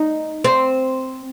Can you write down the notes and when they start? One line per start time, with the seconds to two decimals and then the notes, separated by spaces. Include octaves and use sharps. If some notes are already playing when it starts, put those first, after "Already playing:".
Already playing: D#4
0.44 C4